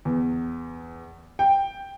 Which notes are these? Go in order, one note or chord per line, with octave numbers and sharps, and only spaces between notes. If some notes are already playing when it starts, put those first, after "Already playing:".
E2
G5